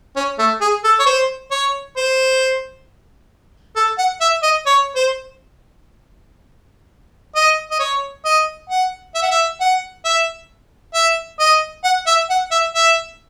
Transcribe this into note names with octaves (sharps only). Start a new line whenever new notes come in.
C#4
A3
G#4
A4
C#5
C5
C#5
C5
A4
F#5
E5
D#5
C#5
C5
D#5
D#5
C#5
D#5
F#5
E5
F#5
E5
F#5
E5
E5
D#5
F#5
E5
F#5
E5
E5